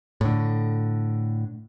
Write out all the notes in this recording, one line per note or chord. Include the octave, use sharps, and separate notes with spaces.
A2 D3